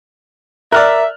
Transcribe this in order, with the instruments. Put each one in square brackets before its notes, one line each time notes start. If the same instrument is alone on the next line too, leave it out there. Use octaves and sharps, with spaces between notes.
[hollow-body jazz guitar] A#4 [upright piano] D5 F6 F#6 [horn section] E5